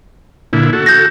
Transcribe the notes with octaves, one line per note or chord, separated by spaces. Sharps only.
A#2 D3 E4
F#4 A4
G6 A#6